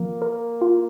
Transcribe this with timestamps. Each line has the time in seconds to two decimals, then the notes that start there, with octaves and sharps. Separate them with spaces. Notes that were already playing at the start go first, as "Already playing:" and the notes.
Already playing: F3 A#3
0.22 A#4
0.61 F4